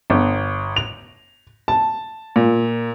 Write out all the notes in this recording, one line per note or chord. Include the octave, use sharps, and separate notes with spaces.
G1
F7
A5
A#2